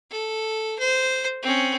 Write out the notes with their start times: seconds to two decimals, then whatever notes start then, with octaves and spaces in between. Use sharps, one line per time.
0.11 A4
0.79 C5
1.43 C4 C#4